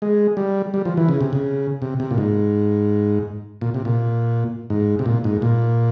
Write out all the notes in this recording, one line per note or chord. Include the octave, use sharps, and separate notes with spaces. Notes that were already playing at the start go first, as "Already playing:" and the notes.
G#3
G3
G3
F3
E3
C#3
C3
C#3
C3
C3
A#2
G#2
A#2
C3
A#2
G#2
C3
A#2
G#2
A#2